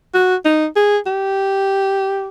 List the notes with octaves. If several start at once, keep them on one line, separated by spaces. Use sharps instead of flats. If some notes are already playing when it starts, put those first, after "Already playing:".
F#4
D#4
G#4
G4